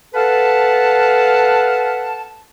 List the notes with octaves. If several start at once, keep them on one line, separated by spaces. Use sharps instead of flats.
A4 B4 F5 F#5 A5